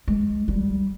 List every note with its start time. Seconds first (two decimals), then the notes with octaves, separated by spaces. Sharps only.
0.08 G#3
0.48 G3